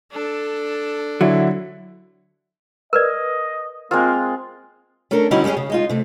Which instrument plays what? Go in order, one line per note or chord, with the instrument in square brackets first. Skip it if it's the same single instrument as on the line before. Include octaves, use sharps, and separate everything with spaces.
[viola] D4 A4
[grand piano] D3 E4 [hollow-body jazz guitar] F#3
[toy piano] A#4 B4 D5 [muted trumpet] D#5
[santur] G#3 C4 F4 [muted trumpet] A#3 [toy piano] A#4
[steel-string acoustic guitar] A3 C#4 D4 A4 A#4
D3 G3 C#4 D#4 E4 F#4
G3 G#3 C#4 G4 G#4
C#3
G#3 D#4 F4
C3 A3